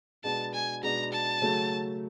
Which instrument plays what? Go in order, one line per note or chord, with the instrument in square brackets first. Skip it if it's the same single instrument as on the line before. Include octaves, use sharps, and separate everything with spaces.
[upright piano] B2 G#3 B3 D4 [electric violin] A5
[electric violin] G#5
[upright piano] B2 G#3 B3 D4 [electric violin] A#5
[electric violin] A5
[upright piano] C#3 F#3 A3 C#4 F#4